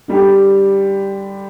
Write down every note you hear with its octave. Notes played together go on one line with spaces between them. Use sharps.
D3 G3 D4 G4